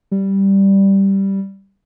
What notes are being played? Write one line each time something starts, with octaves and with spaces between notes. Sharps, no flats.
G3